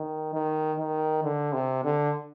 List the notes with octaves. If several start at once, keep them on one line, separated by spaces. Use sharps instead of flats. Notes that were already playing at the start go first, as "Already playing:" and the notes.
Already playing: D#3
D#3
D#3
D3
C3
D3